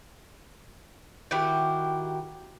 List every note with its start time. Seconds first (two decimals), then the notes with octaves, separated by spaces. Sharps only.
1.31 D#3 E4 F#4 G4